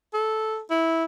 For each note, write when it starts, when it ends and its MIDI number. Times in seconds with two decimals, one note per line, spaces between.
0.14 0.61 69
0.71 1.04 64